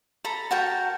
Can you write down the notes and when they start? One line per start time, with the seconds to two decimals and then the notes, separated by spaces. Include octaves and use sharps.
0.24 A4 A#5 B5
0.51 F#4 A#4 G5 A5